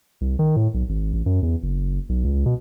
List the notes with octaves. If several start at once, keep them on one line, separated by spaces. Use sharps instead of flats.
C2
D#3
A2
B1
G#1
A1
F#2
E2
F#1
B1
C#2
B2